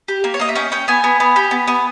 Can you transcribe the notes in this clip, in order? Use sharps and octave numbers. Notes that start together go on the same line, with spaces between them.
G4
A#3
C#5
A#3 D#5
E5
C#4 G5
C#4 G5
B3 G#5
B3
B3
G4
B3
B3